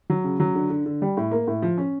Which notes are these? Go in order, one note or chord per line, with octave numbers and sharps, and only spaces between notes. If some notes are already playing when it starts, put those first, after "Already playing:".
F#3
C#3
F#3
D3
D3
D3
G3
A2
A#3
A2
F3
C#4